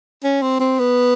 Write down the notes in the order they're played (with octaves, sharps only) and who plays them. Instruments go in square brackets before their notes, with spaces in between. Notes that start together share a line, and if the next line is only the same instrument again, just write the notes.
[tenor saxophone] C#4
C4
C4
B3